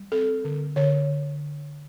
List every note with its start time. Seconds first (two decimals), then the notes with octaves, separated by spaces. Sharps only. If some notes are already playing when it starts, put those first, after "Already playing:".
Already playing: G3
0.12 C4 A4
0.45 D3
0.76 D3 C#5